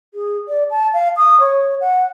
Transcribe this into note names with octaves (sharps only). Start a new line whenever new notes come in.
G#4
D5
A5
F5
D#6
C#5
F#5